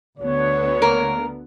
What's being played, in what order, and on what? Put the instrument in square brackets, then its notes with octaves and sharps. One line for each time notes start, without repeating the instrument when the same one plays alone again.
[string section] D2 D3 B3 [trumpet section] C#5
[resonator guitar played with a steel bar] A#3 A#4